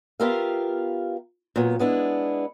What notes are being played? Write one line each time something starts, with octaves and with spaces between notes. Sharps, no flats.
B3 F4 G4 A#4 E5 F5
A#2 F#3 B3
G#3 B3 D4 E4